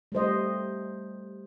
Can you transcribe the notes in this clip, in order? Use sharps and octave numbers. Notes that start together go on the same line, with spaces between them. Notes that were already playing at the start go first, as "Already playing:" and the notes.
G3 A3 C5 D#5